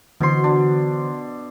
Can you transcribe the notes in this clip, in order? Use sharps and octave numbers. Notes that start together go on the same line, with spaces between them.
B2 D3 E3 C5 C6
D4